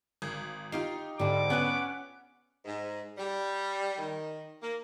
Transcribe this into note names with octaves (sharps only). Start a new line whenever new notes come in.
G#1
D#4 F4 G4 F5
G#2 D3 G3 D4 D6
B3 C#4 B4 F#5 F#6
G#2
G3
D#3
A#3